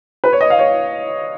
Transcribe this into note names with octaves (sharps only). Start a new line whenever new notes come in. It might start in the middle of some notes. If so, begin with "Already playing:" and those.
B4
C#5
D#5
F5
C#5